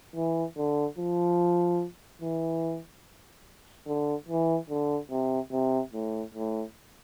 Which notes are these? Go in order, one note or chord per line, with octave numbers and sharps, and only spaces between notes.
E3
D3
F3
E3
D3
E3
D3
C3
C3
A2
A2